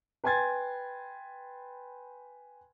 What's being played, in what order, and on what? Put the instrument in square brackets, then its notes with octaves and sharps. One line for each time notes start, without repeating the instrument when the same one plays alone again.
[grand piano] B4 G5 G#5 C6 G#6 A6